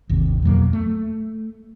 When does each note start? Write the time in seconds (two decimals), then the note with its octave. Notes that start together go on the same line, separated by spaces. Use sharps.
0.09 G#1 D#2 C3
0.42 F2 B2 F#3 A#3
0.73 A3